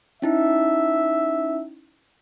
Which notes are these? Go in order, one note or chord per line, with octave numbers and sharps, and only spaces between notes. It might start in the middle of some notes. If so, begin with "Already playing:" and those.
C#4 D#4 E4 E5